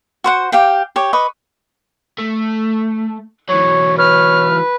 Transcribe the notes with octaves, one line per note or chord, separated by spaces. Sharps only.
F#4 C5 F#5
G4 F5 G5
G4 C#5
B4 D#5 C#6
A3
E3 F#3 C#5
B4 C#5 F6